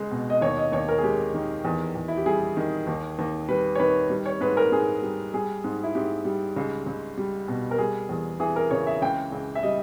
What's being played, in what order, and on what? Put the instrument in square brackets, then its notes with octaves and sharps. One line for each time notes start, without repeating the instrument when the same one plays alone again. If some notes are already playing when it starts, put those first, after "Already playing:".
Already playing: [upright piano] C#2 G#3
B2
D#5
D#2 C#5
D#5
D#2 C#5
A#4
G#4
G#3 G4
D#3
E2
E2
E4
G4
G3 G#4
D#3
D#2
D#2
G3 B4
C#5
D#3 B4
G3
C#5
G#2 B4
A#4
G#2 G#4
G3
G3 G#4
G#2
E4
G#2 G4
G3
C#2
C#2
G3
B2
A#4
G3 G#4
E2
E3 G#4
A#4
C#3 C#5
E5
C#2 G5
C#2
E5
G3 D#5